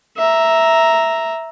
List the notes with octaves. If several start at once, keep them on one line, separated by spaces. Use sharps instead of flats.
E5 A#5